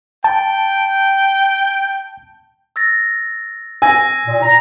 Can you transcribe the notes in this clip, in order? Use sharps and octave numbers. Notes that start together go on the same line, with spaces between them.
G5 A5
E6 A6 A#6
G#5 E6 A#6
A#2
A#5